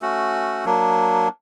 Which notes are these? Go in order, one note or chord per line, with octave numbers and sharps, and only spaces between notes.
A3 C#4 F#4
F#3 A#3 D4